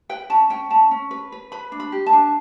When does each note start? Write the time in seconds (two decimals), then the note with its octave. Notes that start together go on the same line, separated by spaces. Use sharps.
0.09 B4 G5
0.30 C#4 A5
0.50 C#4 G5
0.70 C#4 A5
0.91 C#4
1.11 B4
1.32 B4
1.52 B4 B5
1.72 D4
1.80 B5
1.92 G4
2.06 A5
2.13 D4